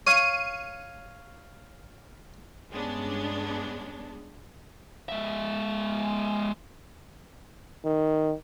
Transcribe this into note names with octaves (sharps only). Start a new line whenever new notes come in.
C#5 F5 C#6 D#7
G2 G#3 B3 C#4 D4
G#3 E5
D#3